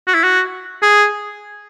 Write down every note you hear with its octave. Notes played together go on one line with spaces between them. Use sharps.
F#4
E4
F#4
G#4